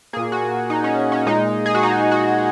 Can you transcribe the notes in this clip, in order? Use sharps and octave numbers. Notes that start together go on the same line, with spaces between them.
A#2 A#3 G#4
F#4
D#4
C#4
C#4
A#2 G#3 D#4
G#4
F#4
D#4
F#4